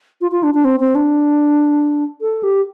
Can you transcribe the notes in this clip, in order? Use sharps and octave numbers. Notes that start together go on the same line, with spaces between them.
F4
F4
D4
D4
C4
C4
D4
A4
G4